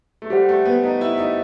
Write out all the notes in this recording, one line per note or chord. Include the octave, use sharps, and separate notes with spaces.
A3
G3 G4 C5 F#5
A3
B3
D#4
E4
D#4